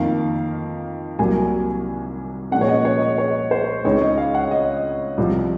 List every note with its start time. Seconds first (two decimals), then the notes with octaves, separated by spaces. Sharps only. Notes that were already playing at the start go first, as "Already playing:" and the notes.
Already playing: F2 D#3 A#3 D#4 F5
1.19 C2 C3 F#3 A#3 G#5
2.51 A#2 F3 G#3 C#4 F#5
2.61 C#5
2.68 D#5
2.85 C#5
3.02 D#5
3.18 C#5
3.51 C5
3.84 C#2 C#3 G#3 C4 D#4 C#5
4.01 D#5
4.18 F5
4.35 F#5
4.51 D#5
5.17 C2 C3 F3